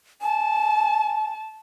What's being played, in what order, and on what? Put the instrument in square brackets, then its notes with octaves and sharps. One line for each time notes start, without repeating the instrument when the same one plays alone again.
[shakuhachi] G#5 [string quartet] A5